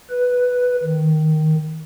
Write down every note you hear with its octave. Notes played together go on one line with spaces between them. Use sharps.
B4
D#3